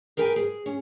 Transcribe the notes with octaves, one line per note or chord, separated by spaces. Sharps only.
G#4 A#4 B4 G5 G#5
G#4
C#4